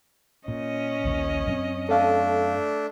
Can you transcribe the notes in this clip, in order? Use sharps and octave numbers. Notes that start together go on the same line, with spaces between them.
A#2 C#4 D#5
A#1 D#2 A#2
F#2 D#3 C4
A3 D4 A4 F5